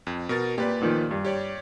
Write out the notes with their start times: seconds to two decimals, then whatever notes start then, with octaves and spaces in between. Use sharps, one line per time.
0.07 F2
0.29 B2 A#4 A6
0.58 A#2 G4 B4 D5
0.81 A#2 D#3 F3
1.11 G2
1.25 G4 C#5 D5